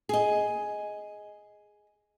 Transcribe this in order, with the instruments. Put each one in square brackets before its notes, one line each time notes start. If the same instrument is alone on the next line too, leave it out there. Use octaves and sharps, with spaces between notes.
[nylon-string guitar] G#4 D#5